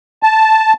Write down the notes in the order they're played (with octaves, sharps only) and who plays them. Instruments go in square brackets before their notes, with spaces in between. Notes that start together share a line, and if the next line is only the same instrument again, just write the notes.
[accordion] A5